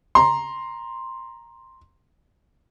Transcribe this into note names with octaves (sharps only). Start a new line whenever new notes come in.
A#5 C6